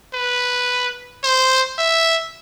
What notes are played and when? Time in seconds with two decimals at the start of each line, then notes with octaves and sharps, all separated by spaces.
0.14 B4
1.24 C5
1.78 E5